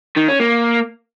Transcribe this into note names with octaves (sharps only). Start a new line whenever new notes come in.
D#3
C#4
A#3